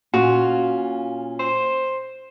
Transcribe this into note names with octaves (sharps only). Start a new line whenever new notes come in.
A#2 C#4 F4 F#4
C5